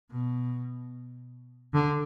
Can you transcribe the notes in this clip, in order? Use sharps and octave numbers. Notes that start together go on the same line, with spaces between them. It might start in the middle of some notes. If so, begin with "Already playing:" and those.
B2
D3